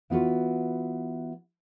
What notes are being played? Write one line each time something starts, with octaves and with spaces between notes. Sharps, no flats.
E3 B3 F4 F#4 B4